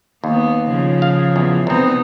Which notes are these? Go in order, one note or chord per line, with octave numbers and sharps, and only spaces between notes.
D#2 A#3 B3
C#3 F3
F5
E2
C2 C3 B3 C4 D#4